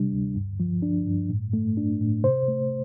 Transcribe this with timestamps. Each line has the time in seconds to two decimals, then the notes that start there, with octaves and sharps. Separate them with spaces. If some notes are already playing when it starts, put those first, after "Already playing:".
Already playing: C3 G3 D4
0.12 D2
0.36 G2
0.60 F3
0.82 D4
1.07 G2
1.30 A2
1.53 A3
1.77 D4
2.01 A2
2.24 C3 C5
2.48 A3